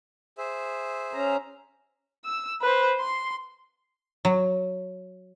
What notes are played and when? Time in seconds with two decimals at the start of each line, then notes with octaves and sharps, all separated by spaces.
0.38 G#4 C5 E5
1.13 C#4 A#5
2.25 E6
2.61 B4 C5
3.00 C6
4.25 F#3